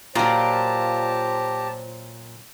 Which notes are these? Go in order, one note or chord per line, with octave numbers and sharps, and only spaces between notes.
A#2 F#3 F4 G4 C5 D5 A5 A#5